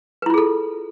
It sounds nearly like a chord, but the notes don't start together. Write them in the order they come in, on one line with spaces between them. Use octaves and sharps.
B4 E4 F4 G#4 A4